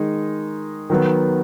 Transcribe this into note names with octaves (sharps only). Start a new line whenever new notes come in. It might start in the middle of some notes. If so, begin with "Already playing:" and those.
Already playing: D#3 G#3 D#4
D#3 F#3 B3